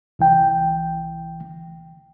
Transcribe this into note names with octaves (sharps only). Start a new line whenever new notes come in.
C2 E3 G5